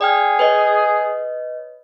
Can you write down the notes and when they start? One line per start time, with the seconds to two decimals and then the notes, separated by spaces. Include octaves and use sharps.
0.01 G#4 D5 G5 F6
0.39 B4 C#5 D#5